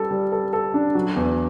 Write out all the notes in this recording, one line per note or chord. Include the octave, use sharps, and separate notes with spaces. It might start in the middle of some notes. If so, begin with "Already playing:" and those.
Already playing: G3 A4
G3
A4
A4
D4
F#3
E2